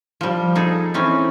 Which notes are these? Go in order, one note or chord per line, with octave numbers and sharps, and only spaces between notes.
F3 G3
D#4 G#4 A4
E3 C4 C#4 D#4